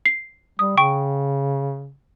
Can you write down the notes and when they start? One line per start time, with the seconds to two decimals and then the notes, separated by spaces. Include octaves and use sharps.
0.06 C7
0.59 G3 D#6
0.77 C#3 G5 C#6